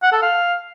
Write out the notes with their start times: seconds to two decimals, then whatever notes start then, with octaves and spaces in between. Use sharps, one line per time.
0.03 F#5
0.12 A4
0.22 F5